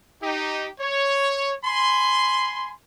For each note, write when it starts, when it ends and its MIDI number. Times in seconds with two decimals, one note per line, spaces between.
0.22 0.68 63
0.22 0.68 67
0.80 1.53 73
1.65 2.73 80
1.65 2.73 83
1.65 2.73 84